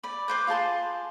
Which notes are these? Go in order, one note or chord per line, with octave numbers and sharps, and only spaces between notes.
D5 B5
B4 C5 D6
F4 G#4 A5 C6